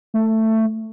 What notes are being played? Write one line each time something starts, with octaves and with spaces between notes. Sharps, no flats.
A3